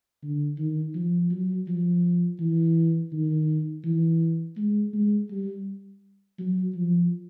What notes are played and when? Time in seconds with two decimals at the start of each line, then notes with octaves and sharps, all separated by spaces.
0.23 D3
0.58 D#3
0.95 F3
1.31 F#3
1.68 F3
2.40 E3
3.13 D#3
3.84 E3
4.57 G#3
4.93 G#3
5.31 G3
6.39 F#3
6.75 F3